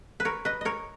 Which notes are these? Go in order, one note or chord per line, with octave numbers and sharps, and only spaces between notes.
B4
A#4 C#5
B4 D#5
A#4 C#5 D#5